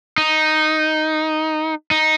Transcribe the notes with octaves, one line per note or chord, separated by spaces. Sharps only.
D#4
D#4